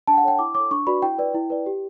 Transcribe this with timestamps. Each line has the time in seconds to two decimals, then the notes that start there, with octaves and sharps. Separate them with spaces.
0.07 D4 A5
0.13 G5
0.17 F#5
0.23 A4 C#5 G5
0.39 E4 D6
0.55 A4 C#5 D6
0.71 D4 C#6
0.87 F#4 B4 D5 B5
1.02 E4 G5
1.19 B4 D5
1.34 E4
1.50 B4 D5
1.66 G4